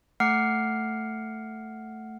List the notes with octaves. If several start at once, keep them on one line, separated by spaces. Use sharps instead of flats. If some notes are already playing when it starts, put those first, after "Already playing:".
A3 F#5 F6 C7